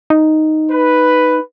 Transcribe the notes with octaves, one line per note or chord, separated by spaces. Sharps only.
D#4
B4